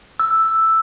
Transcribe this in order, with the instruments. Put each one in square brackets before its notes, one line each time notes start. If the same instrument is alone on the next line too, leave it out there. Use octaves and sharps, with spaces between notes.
[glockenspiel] E6